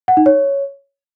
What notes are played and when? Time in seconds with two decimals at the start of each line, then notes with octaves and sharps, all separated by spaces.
0.08 F#5
0.17 D#4
0.26 C#5